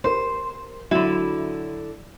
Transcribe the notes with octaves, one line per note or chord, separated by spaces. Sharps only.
A#4 C5
D3 F#3 E4